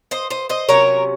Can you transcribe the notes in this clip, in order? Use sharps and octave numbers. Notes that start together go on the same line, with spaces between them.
C5 D#5
C5 D#5
C5 D#5
C3 F#3 C#4 A#4 C#5